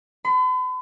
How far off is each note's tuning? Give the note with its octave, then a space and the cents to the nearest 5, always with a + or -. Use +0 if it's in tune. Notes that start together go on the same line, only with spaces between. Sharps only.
B5 +45